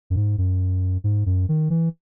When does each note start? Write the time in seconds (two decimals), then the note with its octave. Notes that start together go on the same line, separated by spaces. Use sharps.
0.10 F#2
0.16 G#2
0.38 F#2
1.04 G#2
1.26 F#2
1.49 D#3
1.70 E3